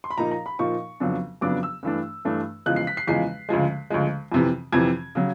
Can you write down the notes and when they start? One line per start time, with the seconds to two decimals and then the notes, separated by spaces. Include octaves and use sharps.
0.04 C6
0.10 B5
0.18 A#2 F3 A#3 D#4 A#5
0.31 A#5
0.46 B5
0.59 A#2 F3 A#3 D#4 C#6
1.00 F2 C#3 F#3 B3 D4
1.41 F2 C#3 F#3 B3 D4 D6
1.63 E6
1.83 G2 E3 A3 D4
2.25 G2 E3 A3 D4
2.66 E2 C#3 F3 G#3 F#6
2.76 C7
2.87 B6
2.97 C7
3.07 E2 C#3 F3 G#3 C7
3.49 D2 C#3 F3 G#3
3.90 D2 C#3 F3 G#3
4.32 F2 C3 E3
4.73 F2 C3 E3 G#6
5.15 C#3 F#3